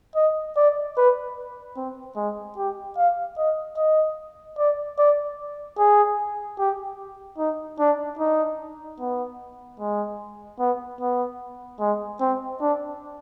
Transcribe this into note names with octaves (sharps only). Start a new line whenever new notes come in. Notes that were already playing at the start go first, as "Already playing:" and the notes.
D#5
D5
B4
C4
G#3
G4
F5
D#5
D#5
D5
D5
G#4
G4
D#4
D4
D#4
B3
G#3
B3
B3
G#3
C4
D4